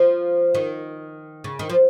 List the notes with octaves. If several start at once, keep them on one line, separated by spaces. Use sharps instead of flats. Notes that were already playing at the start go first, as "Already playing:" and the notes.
Already playing: F3
D#3
C#3
D#3
F3